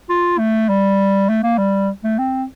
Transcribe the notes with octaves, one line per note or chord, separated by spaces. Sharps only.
F4
A3
G3
A3
A#3
G3
A3
C4